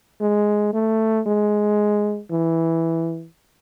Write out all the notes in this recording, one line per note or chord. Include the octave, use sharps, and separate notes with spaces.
G#3
A3
G#3
E3